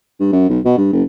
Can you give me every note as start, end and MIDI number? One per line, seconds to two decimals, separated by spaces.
0.20 0.28 43
0.32 0.49 42
0.50 0.60 35
0.65 0.73 47
0.77 0.88 43
0.93 1.02 30